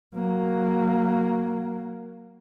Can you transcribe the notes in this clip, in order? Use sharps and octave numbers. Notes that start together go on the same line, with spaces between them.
F#3 A#3